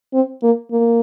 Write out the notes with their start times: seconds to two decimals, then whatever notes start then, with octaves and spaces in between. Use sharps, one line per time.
0.13 C4
0.43 A#3
0.72 A#3